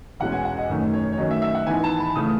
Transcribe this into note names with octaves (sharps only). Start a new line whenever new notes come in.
E2 B2 G#3 C#4 F#5
G#5
F#5
D#5
F#2 D#3 A3 C#4
C#5
C#5
D#3 F#3 A3 C#4 D#5
E5
E5
F#5
G#2 E3 B3 D#4 G#5
A5
B5
C#3 E3 A3 D#6